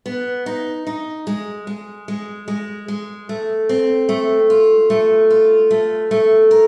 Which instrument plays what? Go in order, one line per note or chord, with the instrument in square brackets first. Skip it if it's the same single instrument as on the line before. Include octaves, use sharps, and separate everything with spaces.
[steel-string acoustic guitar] B3
D#4
D#4
G#3
G#3
G#3
G#3
G#3
A3
C4
A3
F4
A3
F4
A3
A3
A#4